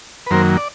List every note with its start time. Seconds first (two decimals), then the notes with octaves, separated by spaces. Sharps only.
0.27 B4
0.31 F#2 D#3 F#3 A#3 A#4 C5
0.57 D5